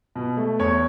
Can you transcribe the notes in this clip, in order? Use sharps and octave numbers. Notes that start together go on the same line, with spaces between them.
B2
A3
E2 C#5